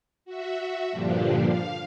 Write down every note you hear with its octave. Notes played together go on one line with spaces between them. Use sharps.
F#4 E5
G2 A#2 D3 F3 G3 D4
F5